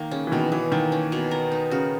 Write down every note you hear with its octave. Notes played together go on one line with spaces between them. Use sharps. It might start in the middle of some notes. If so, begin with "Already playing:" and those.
Already playing: D#3 A#3
C#3 C#4
E3
B2 D#3
B2 E3
D#3 A#3
C#4
B2
A#4
D#4
C#3 F#4